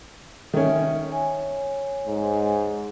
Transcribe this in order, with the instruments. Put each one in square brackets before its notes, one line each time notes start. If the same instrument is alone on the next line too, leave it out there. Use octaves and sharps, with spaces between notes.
[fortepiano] D#3 C#4 [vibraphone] E5
[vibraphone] C#5 G#5
[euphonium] G#2